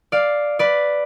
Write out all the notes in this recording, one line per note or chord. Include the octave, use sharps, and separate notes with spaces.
D5 F5
B4 D5